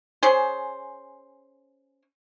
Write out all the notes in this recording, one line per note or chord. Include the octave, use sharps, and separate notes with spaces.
C#4 G#4 C5